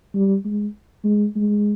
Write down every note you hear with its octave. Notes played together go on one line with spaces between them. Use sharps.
G3
G#3
G#3
G#3